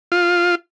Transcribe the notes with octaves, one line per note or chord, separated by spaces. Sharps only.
F4